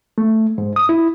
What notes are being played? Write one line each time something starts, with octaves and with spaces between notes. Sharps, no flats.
A3
G#2
D#6
E4